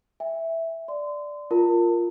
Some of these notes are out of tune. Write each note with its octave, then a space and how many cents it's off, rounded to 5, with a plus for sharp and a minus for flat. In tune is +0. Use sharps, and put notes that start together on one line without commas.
E5 +0 G5 +45
D5 +0 C6 -30
F4 +0 A#4 +0 A5 +30